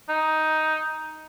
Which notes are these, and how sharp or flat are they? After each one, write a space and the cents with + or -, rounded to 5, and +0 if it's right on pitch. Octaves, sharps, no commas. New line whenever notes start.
D#4 +10